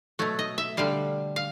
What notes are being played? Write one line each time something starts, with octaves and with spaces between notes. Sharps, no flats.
B2 F#3 A3
D#5
E5
D3 G3 F5
F5